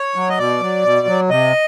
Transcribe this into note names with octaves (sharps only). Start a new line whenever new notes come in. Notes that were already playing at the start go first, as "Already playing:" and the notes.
Already playing: C#5
F#3
D#5
B2 D5
F#3
B2
F#3
C3 D#5